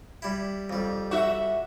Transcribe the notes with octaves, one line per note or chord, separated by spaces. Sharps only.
G3 E4
F2 G3
F#4 E5